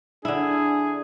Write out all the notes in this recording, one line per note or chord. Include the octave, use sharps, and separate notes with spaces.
D3 D4 E4 G#4